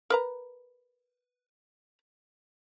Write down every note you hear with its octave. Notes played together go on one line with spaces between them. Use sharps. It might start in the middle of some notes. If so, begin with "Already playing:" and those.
A#4 B4 A#5